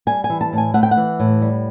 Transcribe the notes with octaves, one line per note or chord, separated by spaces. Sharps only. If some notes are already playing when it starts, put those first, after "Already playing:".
G3 G#5
G#5
E3
A5
A2
G#5
A3 F#5
G5
F#5
E3
A2
G3